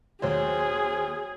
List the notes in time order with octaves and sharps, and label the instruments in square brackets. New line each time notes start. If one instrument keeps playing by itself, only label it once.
[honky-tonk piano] D#2 C5 [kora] F#3 [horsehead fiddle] G#4